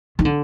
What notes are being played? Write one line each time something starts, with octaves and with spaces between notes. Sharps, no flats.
D#3
D3